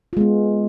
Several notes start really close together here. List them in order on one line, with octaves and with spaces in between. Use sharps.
F4 G#3 B3